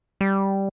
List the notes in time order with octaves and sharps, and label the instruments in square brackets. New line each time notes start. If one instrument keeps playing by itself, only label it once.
[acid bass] G3